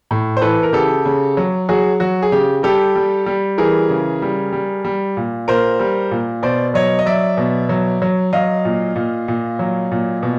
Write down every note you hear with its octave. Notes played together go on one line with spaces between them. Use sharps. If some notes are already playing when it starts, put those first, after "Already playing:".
A2
C5
E3 A4 B4
A#4
C#3 G4 A4
C#3
F#3
F#3 F#4 G#4
F#3 F#4
G#4
C#3 G4
G3 G4 A4
G3
G3
E3 G#4 A#4
C#3
G3
G3
G3
A#2
A#2 A#4 C5
G3
A#2
B2 C5 D5
F#3 C#5 D#5
D#5
F#3 D5 E5
B2
F#3
F#3
F#3 D#5 F5
A#2
A#2
A#2
F#3
A#2
B2